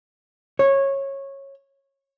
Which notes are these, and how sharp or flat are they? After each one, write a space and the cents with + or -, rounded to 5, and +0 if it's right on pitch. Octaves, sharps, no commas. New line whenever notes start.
C#5 -15